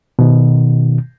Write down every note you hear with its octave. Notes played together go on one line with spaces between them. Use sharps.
B2 D#3